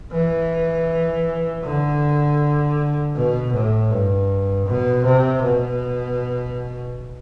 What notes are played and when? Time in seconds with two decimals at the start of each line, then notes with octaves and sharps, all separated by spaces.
0.12 E3
1.63 D3
3.15 B2
3.53 A2
3.91 G2
4.67 B2
5.05 C3
5.43 B2